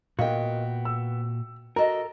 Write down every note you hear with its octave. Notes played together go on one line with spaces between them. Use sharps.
A#2 B3 F#4 A#4 D#5 F5 G5
E6
F#4 A4 A#4 D#5 E5 A#5